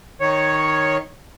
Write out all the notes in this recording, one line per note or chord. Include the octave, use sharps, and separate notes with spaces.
D#3 C#5